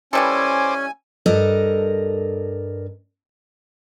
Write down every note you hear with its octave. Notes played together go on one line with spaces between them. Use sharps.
E3 G3 C#4 A4 C5 D5 G#5
G2 A4 A#4 D#5